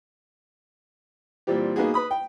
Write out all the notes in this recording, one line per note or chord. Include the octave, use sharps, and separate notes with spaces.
A#2 E3 G3 C4 G4
A#3 B3 D#4 F#4 G#4
B4 B5 D#6
G5